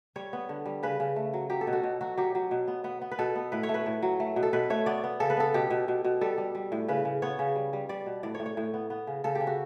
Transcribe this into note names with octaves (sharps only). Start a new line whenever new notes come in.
G3 C#5
B3
D3
G3
C#3 B4
C#3
A3
F#3
F#3 G4
A4
B2
F#4
B2
F#3 F#4
F#3 G4
F#3
B2
B3
B3
B3
B4
B2 A4
B3
A2 B4
C#5
A3
B4
A2
F#3
A3
B2
A4
B2 B4
A3 C#5
B3 D5
B3
C#3 A4
B4
B3 A4
B2 G4
B2
B2
B2
G3 A4
G3
G3
A2
C#3 B4
C#3
B3 C#5
C#3
G3
G3
G3 D5
B2
A2 D5
C#5
A2
C#5
A2
B3
B3
C#3
C#3 A4
G4
C#3
F#4